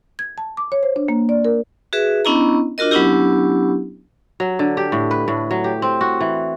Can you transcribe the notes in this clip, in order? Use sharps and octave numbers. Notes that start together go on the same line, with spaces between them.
G#6
A5
D6
C#5
C5
D4
A#3
D5
A#4
F#4 G#4 B4 E5
B3 C#4 D4 E4 D#5 A#5
D4 F4 F#4 A#4 D#5
F#3 B3 C#4 D4 E4 G4
F#3
D3
G4
A2
B4
A2
F#3
G4
C4
F#4
E3